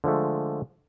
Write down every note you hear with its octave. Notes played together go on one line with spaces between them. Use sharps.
D3 F3 G#3 A3